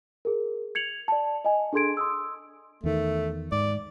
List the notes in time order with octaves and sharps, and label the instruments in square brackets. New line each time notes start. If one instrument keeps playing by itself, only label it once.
[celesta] G#4 A#4
G#6 C#7 F7 F#7
D5 A5
D#5 G#5
D4 G#4 A4 C6 G#6 D7
C6 D#6 E6
[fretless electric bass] E2 D#3 [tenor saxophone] A3
[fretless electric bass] G#2 [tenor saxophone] D5